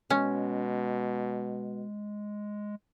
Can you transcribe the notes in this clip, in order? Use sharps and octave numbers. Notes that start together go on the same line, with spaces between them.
B2 G#3 C#4